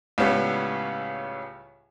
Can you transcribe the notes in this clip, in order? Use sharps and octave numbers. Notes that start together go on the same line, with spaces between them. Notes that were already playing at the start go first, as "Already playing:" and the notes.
C#2 A2 G3 B3 C#4 G4